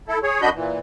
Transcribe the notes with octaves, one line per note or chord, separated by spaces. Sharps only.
E4 A4
G#4 C#5
F#2 D4 F#4 D#5 B5 G6
A#2 E3